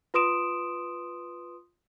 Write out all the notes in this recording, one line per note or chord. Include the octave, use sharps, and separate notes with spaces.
F4 B4 C6 D#6 D7 E7